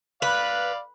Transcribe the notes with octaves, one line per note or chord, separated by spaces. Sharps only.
B4 D5 F5